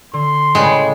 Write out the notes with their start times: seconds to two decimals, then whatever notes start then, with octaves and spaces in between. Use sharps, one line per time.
0.13 D3 C6
0.55 A2 C#3 G3 G#3 C#5 D5 G5